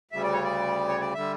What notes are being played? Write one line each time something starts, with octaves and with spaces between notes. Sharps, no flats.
D2 C#3 G3 E5
D5
C#5
D5
C#5
D5
D3 G3 E5